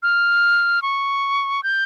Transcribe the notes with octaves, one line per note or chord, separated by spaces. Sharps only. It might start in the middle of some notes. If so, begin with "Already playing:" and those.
F6
C#6
G6